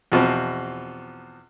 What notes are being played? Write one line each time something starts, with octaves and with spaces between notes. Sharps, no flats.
E2 B2 F3 C4